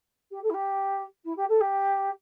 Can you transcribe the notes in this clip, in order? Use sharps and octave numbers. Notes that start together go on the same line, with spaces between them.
G4
A4
E4
G4
E4
G4
A4
G4